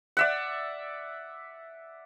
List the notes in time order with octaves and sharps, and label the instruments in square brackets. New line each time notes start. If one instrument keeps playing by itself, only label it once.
[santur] D5 E5 F#5